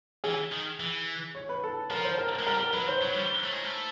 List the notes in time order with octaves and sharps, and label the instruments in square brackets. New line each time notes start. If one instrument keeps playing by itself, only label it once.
[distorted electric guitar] E3 [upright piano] G#4
[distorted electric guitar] D#3
E3
[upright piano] C#5
B4
A4
[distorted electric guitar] F3 [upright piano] A#4
[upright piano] C5
A#4
A#4
[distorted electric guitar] G#3
[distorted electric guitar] G3 [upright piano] A#4
[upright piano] A#4
[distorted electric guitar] F#3 [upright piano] B4
[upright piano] C5
[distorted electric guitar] F#3 [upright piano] C#5
[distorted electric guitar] G3
A3
G#3
A3